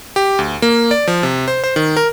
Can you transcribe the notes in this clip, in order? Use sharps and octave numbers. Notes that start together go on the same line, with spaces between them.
G4
D2
A#3
D5
F3
C3
C5
C5
D#3
A#4